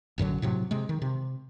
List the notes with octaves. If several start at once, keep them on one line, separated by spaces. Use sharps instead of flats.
A1 F#2 D3 F#3
A2 C3 F#3
C3 G#3
D#3
C3